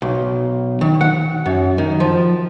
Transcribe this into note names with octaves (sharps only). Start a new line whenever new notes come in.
B1
D#3
F#5
F#2
D#3
F3